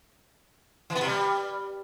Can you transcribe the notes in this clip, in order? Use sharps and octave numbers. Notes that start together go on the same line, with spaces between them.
E3
B3
C3
G3